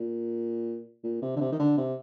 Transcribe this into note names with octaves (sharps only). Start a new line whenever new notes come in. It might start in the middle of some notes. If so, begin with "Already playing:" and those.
Already playing: A#2
A#2
C3
D3
C3
D#3
D3
C3